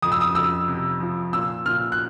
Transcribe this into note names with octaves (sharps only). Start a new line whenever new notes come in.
F2 D#6
E6
D#6
F2 E6
C3
F3
A#2 E6
A#2 F6
F#6